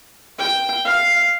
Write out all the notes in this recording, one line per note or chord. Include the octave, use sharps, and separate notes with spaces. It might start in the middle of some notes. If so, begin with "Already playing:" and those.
G5
F5